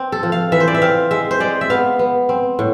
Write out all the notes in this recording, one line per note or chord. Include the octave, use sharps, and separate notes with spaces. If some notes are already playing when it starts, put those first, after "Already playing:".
Already playing: C4
A4
F3
F5
E3 E5
C5
D5
E5
C4 F5
G#3 E5
C5
G#3 D5
E5
B3 F5
B3
C4
A2